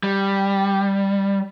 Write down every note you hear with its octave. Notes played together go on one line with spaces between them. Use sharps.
G3